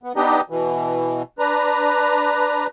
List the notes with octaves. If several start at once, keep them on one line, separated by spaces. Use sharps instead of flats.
B3
B3 D4 D#4 G4 D#5
B2 E3
D4 B4 A#5